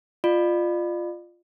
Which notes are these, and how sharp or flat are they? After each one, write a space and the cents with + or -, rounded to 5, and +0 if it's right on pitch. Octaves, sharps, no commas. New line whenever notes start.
F4 +0 D5 +40